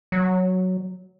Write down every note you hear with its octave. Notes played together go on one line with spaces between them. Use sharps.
F#3